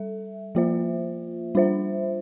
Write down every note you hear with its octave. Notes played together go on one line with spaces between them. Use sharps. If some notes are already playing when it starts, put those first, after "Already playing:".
Already playing: G3 A4 E5
F3 A#3 F4 C5 E5
G3 D4 F4 C5 E5